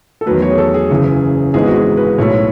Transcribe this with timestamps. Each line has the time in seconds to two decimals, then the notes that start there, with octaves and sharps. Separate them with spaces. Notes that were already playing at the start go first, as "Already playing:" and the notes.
0.21 A4
0.26 E2 D#3 F#3 A3 B4
0.42 C#5
0.51 G#4
0.58 A4
0.74 G#4
0.90 F#1 F#2 C#3 E3
1.54 G#1 G#2 E3 G#3 B3 G#4
1.67 F#4
1.76 G#4
1.97 B4
2.18 B1 A2 F#3 A3 C#5